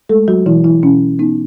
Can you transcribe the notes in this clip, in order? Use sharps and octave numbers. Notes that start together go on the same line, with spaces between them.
G#3 A3 A4
F#3 F#4
B2 E3 E4
E3 E4
B2 C#4
B3 D#4